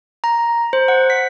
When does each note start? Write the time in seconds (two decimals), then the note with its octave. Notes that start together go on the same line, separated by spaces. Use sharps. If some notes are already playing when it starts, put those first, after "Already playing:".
0.24 A#5
0.73 C5
0.88 F#5
1.10 B6